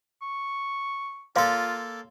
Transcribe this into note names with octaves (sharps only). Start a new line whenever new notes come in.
C#6
A#3 F4 A4 C#5 F5 C6